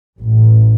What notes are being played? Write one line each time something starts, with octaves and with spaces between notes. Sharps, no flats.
A1